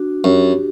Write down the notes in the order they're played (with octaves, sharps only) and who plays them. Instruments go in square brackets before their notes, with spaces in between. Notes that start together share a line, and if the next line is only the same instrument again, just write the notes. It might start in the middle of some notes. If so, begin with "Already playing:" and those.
Already playing: [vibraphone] D4 F#4
[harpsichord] F#2 [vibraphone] G4